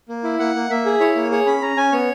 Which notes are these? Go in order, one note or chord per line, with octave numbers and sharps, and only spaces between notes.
A#3
E4
A#3 F#5
A#3
A#3 E5
G#4
E4 C#5
A#3
G#4 C#5
C#4 B5
C#4 A#5
C#4 G#5
B3 C#5